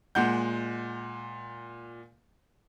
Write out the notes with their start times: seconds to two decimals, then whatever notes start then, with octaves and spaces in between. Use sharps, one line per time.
0.15 A#2 G#3 F#5 G6